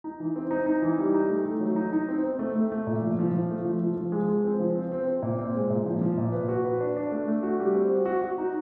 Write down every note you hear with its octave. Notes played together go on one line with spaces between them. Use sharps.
D#4
E3
C4
D#4
D#4
E3
G3
D#4
A3
A3
F#3
D#4
D#4
C4
C4
A3
A3
A3
A#2
F3
F3
F3
A3
F3
F3
F3
G#3
G#3
C4
F3
C4
C4
C4
A#2
C4
G#3
A#2
F3
F3
A#2
B4
F#4
B4
D4
D4
A3
A3
F#4
G3
C4
F#4
F#4
F#4
D#4